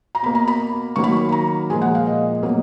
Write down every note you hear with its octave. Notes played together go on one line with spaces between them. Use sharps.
A#5
B2 A#3 B5
A#5
B5
D#3 F#3 A#3 C#6
B5
C#6
B5
A#5
A#2 F3 G#3 G#5
F#5
F5
D#5
B2 F#3 A#3